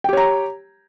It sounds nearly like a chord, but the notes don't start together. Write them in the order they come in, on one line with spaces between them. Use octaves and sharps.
G5 G4 C#5 A#5